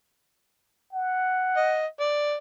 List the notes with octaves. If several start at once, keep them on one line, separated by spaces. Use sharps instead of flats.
F#5
D#5
D5